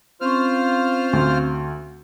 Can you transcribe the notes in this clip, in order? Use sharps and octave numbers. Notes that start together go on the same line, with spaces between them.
C4 C#4 F4 C5 C#6 F6
D2